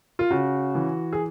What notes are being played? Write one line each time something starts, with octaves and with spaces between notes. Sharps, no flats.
F4
C#3 F#4
E3
G#4